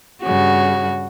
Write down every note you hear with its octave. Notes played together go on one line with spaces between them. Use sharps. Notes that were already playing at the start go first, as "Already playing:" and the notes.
G2 C#3 F#4